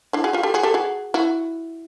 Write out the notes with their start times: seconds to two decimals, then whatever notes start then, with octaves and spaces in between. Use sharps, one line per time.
0.13 D4 E4
0.24 F#4 G#4
0.33 F4 G4
0.43 G4 A4
0.54 F#4 G#4
0.63 G4 A4
0.74 F#4 G#4
1.14 E4 F#4